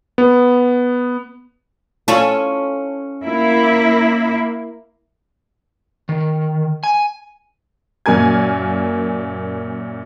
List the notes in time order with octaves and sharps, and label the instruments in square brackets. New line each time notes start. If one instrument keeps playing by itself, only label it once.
[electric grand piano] B3
[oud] C#4 F4 A4
[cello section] A#3 E4
[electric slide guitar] D#3
G#5
[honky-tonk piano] F#2 A#2 A#3 G#5 G#6